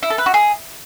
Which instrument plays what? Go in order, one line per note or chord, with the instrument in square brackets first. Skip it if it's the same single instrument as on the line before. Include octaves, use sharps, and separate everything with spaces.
[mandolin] E4
A4
B4
F#4
G#4